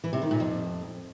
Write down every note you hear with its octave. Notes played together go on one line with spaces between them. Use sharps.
E3
C3
D#3
A#2
F2